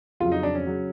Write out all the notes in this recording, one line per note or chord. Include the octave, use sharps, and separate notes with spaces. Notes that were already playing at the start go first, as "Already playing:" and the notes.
F2 C#3 F#3 F4
D#4
D4
C#4
C#3 F#3